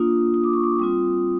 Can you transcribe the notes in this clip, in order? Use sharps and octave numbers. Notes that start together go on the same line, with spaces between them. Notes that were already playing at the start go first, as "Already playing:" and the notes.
Already playing: A#3 D4 F4 D#6
D#6
D6
C#6
D6
G3 C4 F4 D#6